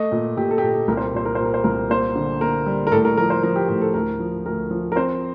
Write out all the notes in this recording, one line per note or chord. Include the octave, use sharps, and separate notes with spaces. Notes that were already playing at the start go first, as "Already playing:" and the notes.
Already playing: A3 D#5
A#2
A#2 G4
A4
G4
A#2 A4
A4
C2 A#4
C5
A#4
A#2 C5
A#4
A#2 C5
A#4
C5
C2 A#4
A#3 C5
D3
A#3 A#4
G3
A#4
A2 A4
A#4
F3 A#4
C5
F3 A#4
G4
A2 G4
A4
D2 A#4
F3
D2 A#4
F3
A#4
C4 C5